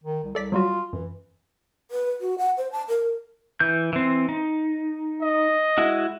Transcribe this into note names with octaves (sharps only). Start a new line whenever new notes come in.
D#3
C2
C2 A4 D5 B6
F#3 G3 F4 F#4
F#2 E3
B4
F#4
F#5
C5
A5
A#4
E3 G6
E3 C4
D#4
D#5
G#3 E4 F#4